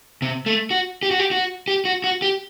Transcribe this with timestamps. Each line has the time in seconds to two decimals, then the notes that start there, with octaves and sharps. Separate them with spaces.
0.22 C3
0.46 A3
0.71 F#4
1.03 G4
1.11 F#4
1.19 G4
1.31 F#4
1.68 G4
1.85 F#4
2.04 F#4
2.22 G4